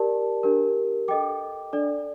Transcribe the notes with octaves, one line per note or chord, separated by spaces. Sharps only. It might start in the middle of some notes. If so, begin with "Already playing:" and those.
Already playing: G4 A#4 D5 A5
D4 G4 A#4
A4 D#5 G5 D6
D4 A4 D5